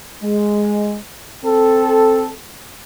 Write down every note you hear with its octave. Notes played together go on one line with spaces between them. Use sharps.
G#3
C4 A4